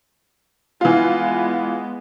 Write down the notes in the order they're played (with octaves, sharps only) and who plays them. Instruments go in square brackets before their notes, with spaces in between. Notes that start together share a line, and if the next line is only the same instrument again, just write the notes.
[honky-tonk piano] E3 F4 [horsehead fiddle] G#3 B3